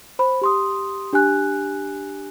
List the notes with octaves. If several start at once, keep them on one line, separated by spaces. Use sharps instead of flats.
C5 B5
G4 C6 D#6
D4 G4 G#5 F#6